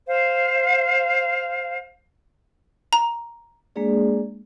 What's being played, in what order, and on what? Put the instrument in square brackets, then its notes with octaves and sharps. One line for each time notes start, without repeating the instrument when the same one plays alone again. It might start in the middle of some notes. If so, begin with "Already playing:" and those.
[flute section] C5 F5
[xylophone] A#5
[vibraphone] G#3 A#3 D4 G#4 D5